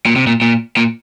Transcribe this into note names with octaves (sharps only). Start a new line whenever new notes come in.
A#2
C3
A#2
A#2
A#2